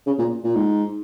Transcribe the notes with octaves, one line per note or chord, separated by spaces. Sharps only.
C#3
A#2
A#2
G#2